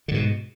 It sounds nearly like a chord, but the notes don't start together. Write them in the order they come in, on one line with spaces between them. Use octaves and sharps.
D3 G#2 B2